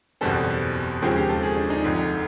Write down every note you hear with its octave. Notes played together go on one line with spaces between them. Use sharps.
F#1 E2 B2 G3 C4 A4
D#2 C#3 F3 G#3 C4 G4
G4
A4
G#4
D4
D#4
F1 F2 D3